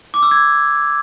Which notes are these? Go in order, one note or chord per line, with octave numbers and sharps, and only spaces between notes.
D6
E6
G#6